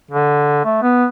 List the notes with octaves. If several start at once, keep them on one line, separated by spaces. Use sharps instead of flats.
D3
A3
B3